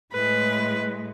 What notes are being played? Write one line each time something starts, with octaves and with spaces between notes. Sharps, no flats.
A2 G#3 B4